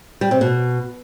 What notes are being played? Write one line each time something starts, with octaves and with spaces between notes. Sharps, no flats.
G3
C3
B2